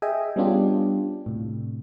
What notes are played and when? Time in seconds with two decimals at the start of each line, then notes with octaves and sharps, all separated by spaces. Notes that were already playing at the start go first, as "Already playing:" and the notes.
0.02 G#4 D#5 E5 G5 G#5
0.36 G3 B3 C#4 D4 F4 G4
1.26 A2 C3